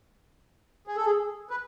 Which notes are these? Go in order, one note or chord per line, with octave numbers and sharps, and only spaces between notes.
G#4
A4
G#4
B4